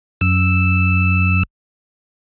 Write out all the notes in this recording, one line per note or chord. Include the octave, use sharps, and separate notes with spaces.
F#2 E6